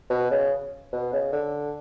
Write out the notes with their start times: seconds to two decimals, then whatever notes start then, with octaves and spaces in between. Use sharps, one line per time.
0.10 B2
0.31 C#3
0.92 B2
1.13 C#3
1.32 D3